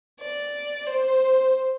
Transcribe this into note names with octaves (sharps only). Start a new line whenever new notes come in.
D5
C5